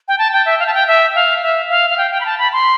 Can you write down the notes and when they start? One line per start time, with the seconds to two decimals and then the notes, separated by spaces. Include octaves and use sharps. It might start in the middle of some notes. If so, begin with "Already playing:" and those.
0.08 G5
0.18 A5
0.32 G5
0.46 E5
0.59 F5
0.67 A5
0.74 G5
0.87 E5
1.15 F5
1.43 E5
1.69 F5
1.90 F5
1.97 G5
2.11 G5
2.21 B5
2.26 A5
2.38 B5
2.53 C6